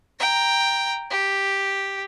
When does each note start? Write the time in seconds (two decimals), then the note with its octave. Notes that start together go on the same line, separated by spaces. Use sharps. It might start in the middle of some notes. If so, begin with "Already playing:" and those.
0.19 G5 A#5
1.10 G4